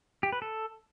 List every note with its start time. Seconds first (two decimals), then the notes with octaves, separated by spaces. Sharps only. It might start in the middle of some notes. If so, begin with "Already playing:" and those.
0.23 G4
0.32 B4
0.42 A4